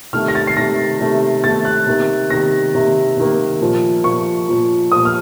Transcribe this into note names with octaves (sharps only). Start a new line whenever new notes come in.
C3 D#3 A3 F6
A#6
A6
C7
C3 D#3 A3 A#6
C3 D#3 A3
C3 D#3 A3 A6
F#6
C3 D#3 A#3
C3 D#3 A#3 A#6
C3 D#3 A#3
C3 D#3 A#3
A#2 F3 A#3
A#2 F3 A#3 C#6
A#2 F3 A#3
A#2 F3 A#3 D#6
F6